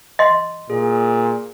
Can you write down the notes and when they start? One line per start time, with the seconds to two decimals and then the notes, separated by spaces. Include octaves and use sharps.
0.19 D#5 C6
0.70 A#2 G#4